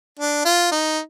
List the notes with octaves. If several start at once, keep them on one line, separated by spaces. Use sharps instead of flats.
D4
F4
D#4